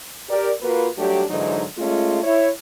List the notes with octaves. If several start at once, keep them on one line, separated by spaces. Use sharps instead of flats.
G4 A#4 D5
A#3 F4 F#4 B4
F#3 G3 A3 D4 G4
G#2 D3 E3 F#3 G#3 D#4
G#3 A3 C#4 F4
E4 C#5